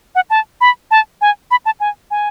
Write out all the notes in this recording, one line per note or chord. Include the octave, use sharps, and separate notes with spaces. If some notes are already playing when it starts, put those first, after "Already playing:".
F#5
A5
B5
A5
G#5
B5
A5
G#5
G#5